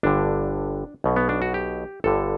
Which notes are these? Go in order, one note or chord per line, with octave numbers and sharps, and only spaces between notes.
G1 G2 D3 D4
B1 B2
B3
D4
F#4
G4
G1 G2 D3 A4